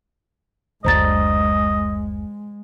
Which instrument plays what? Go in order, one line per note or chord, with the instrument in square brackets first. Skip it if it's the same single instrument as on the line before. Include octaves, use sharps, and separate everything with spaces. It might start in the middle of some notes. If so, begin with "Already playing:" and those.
[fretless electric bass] F#1 D2 D3 [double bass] G#3 [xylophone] C5 A#5 A6 [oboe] D#5